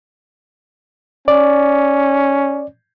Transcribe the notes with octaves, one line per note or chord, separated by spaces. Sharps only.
C#4 D5